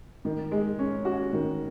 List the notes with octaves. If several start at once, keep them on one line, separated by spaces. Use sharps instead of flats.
D#3
G#3
C#4
F#4
D#3